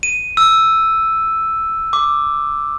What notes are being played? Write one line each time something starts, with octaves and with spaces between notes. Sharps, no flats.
D#7
E6
D6